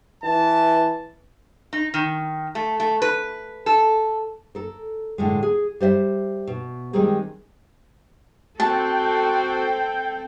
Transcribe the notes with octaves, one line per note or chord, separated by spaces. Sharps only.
E3 A5
D#4
D#3
A3
A3
B4
A4
A4 A#4
A2 D3 G#3
G#4
G3 C5 D#5 E5
B2
D#3 G3 G#3 C4 G#4 A#4
C4 F#4 A4 G5 A5 G6